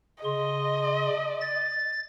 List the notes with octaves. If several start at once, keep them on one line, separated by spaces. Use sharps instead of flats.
C#3 D#5 C6
A6